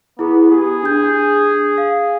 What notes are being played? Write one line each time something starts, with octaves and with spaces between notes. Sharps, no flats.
B3 E4 G#4
G4 G#4
D4 G6
F5